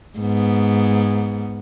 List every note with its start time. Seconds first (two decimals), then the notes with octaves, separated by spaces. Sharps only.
0.18 G#2 B3